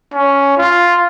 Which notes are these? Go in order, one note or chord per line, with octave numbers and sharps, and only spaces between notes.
C#4
F4